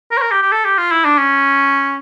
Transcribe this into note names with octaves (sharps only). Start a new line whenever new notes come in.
A#4
C#5
A#4
G4
G4
A4
G4
F4
E4
D4
C#4